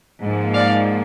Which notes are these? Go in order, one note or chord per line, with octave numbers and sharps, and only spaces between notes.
G#2 F3 A#3
D5 F5